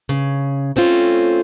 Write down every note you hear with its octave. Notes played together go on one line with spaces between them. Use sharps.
C#3
A3 C4 C#4 F4